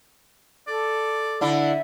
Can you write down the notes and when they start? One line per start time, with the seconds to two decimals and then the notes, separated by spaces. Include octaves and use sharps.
0.68 A4 D5
1.41 D3 E4
1.59 E5